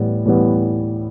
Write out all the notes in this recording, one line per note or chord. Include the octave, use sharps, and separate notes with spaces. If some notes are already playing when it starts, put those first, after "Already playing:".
Already playing: A2 E3 G3 B3
A2 E3 G3 B3